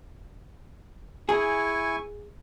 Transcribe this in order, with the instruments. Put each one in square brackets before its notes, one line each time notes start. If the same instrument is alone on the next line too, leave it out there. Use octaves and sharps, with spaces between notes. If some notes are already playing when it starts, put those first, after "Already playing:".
[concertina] E4 G#5 C#6 [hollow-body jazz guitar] G#4